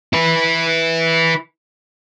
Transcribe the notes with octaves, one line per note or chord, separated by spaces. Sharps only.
E4 B4